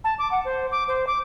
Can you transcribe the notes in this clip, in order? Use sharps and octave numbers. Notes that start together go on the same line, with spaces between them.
A5
D6
F#5
C5
D6
C5
D6